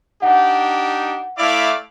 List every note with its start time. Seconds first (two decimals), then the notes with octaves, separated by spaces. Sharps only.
0.22 D4 D#4 G4 F#5
1.38 A3 E4 D5 F5 D6